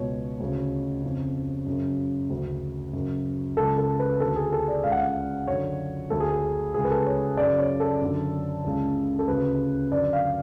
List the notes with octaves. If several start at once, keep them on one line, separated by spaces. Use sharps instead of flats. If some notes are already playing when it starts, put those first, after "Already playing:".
Already playing: C#2 B2 C#5
D2 C#3
F2 C#3
F#2 C#3
D2 C#3
F#2 C#3
C#2 C#3 A4
A4
B4
D2 D3 A4
G#4
A4
D5
C#2 C#3 F5
F#5
F5
F#2 D3 C#5
D2 D3 A4
G#4
A4
C#2 C#3 G#4
B4
A4
C#5
F#2 C#3 D5
C#5
A4
F#2 D3
C#2 C#3
A4
D2 C#3 B4
F#2 D3 D5
F5